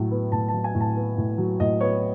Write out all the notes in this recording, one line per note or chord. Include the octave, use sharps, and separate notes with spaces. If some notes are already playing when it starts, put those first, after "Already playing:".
Already playing: A2 F#3
B3
A2 A5
A5
F#3
G#5
A2
A5
B3
A2
F#3
A2 D#5
B3 C#5